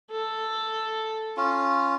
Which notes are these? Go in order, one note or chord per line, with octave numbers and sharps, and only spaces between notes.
A4
C#4 F4